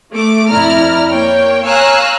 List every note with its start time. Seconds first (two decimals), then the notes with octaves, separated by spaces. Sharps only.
0.11 A3 D6
0.50 F2 E4 D5 A#5 F6
1.10 A#3 C#5 G5
1.63 C#5 F5 G#5 A#5 E6 F#6